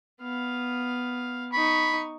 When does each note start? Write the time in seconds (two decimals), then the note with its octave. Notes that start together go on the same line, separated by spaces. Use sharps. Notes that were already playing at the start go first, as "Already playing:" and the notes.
0.22 B3 F5
1.53 D#4 B5 C#6